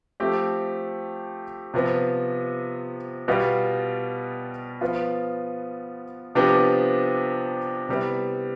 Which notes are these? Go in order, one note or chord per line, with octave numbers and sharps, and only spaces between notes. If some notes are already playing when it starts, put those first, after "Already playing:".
F3 A3 C4 G4
C3 F3 B3
B2 G3 B3 F4
F3 B3 F4
C3 F3 B3 D4 G4
C3 G3 B3 E4